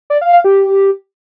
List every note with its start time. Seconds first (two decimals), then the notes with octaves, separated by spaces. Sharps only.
0.10 D5
0.21 F5
0.33 F5
0.44 G4